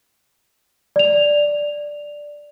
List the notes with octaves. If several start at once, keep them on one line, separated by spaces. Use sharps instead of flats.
D5 F7